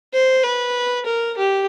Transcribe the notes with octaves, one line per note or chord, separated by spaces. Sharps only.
C5
B4
A#4
G4